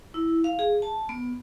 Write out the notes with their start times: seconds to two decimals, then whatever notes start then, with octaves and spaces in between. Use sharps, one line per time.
0.14 E4
0.44 F5
0.59 G#4
0.82 A5
1.09 B3